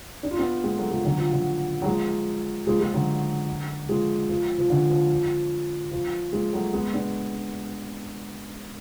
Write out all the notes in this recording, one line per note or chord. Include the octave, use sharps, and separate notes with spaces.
D4
F4
B3 D4
G#3 B3
F#3 A3
F3 G#3
D3 F#3
F3
D3 F#3
F#3
F3 G#3
F3 G#3
F3 G#3
D3 F#3
F3 G#3
F3
F3
D3
F3
F3
F3 G#3
F#3 A3
G#3 B3
B3 D4